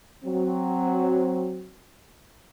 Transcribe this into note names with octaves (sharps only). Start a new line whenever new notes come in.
F#3 C4